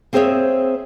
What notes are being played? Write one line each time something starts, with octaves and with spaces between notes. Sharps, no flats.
A#3 C4 G#4 C5 C#5 E5